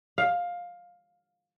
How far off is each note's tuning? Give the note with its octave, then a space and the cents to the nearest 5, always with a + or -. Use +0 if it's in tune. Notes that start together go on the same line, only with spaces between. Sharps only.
F5 +15